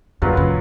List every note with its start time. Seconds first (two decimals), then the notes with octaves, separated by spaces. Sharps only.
0.22 F#2 A#2 F#3 C#4 F4 B4
0.37 C#3